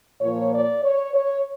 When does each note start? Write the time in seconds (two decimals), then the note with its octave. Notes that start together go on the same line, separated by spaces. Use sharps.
0.21 A#2 F3 A#3 C#5
0.53 D5
0.83 C#5
1.14 C#5